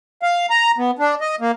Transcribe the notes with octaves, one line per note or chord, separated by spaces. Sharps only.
F5
A#5
B3
D4
D#5
A#3